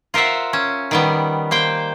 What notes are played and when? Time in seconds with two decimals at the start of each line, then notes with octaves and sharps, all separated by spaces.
0.14 F4 A#4 C5 E5 F#5
0.53 C#4
0.91 D#3 G3 B3
1.51 A#3 C5 G5